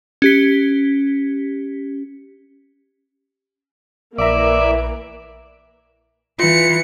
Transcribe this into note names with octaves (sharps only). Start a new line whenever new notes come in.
C#4 G4 B6
A#1 E3 A#3 D5 E5 A#5
E3 F4 C#7